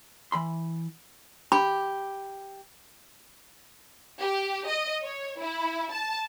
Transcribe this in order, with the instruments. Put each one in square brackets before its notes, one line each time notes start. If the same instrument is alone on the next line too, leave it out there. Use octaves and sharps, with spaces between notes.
[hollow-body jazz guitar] E3 B5 C6
[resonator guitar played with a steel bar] G4 [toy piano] B5
[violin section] G4
D#5
C#5
E4
A5